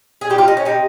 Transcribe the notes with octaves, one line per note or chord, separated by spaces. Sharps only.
G#4
C3 G3 G4
F4
D#4
C#4
C3 G3 D#4